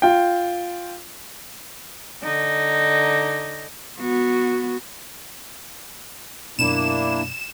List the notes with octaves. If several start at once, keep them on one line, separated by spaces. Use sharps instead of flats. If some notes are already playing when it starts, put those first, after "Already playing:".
F4 G5
D3 D#4
B3 F#4
F#2 B2 A#3 D4 E4 E7